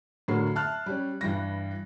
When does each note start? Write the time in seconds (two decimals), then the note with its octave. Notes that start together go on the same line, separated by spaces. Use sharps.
0.28 A2 D3 F#3 A#4 C7
0.55 E5 A5 F6 F#6
0.86 G3 C#4
1.21 G2 E3 G3 A#6